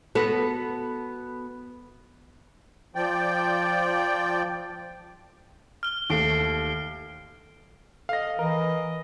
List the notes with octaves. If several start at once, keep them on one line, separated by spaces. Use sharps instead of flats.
B3 F#4 A4
F3 D5 G5
F6 G7
D#2 A3 C7 D7 G7
A4 D#5 F5 A#6
E3 A#4 D#5